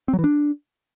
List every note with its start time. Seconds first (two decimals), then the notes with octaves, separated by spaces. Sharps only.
0.08 C4
0.13 F#3
0.19 E3
0.24 D4